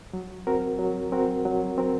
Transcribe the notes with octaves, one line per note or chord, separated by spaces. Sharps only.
F#3
C4 F#4 A#4
F#3
C4 F#4 A#4
F#3
C4 F#4 A#4